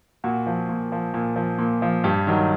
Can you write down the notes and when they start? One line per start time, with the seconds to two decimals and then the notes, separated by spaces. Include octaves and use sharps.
0.24 A#2 F#4
0.46 F3
0.69 A#2
0.92 F3
1.14 A#2
1.36 F3
1.59 A#2
1.82 F3
2.04 G2 G4
2.27 D#3 F#3